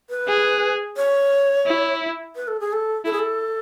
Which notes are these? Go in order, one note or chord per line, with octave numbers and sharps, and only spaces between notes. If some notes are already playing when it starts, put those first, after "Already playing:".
B4
G#4
C#5
E4
B4
A4
G#4
A4
E4 A4
G#4
A4